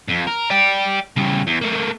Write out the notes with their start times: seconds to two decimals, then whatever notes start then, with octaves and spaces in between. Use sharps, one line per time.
0.08 F2
0.27 A#4
0.50 D5 G5
1.16 C#3 G3
1.47 E2
1.62 A3 A#3